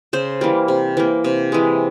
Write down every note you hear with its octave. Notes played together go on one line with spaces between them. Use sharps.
C#3 C5
E3 G3 A#3
C3
E3 A#3
C3
E3 G#3